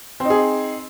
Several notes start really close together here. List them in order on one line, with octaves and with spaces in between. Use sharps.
C4 D#4 G#4